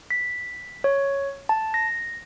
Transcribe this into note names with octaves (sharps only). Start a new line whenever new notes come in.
B6
C#5
A5
A#6